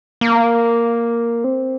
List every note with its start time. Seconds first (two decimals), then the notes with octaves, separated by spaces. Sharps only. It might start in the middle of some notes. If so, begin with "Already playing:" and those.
0.21 A#3
1.44 C4